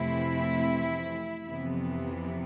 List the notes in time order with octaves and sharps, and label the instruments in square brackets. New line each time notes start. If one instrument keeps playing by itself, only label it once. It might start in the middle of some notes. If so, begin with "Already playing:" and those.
Already playing: [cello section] F2 C3 E3 A3 C4 E4
F2 C3 E3 B3